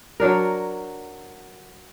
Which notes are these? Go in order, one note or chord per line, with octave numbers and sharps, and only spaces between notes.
F#3 D4 A#4